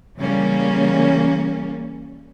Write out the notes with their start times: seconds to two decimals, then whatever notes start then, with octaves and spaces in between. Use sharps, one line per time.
0.19 C#3 E3 G3 A#3 C#4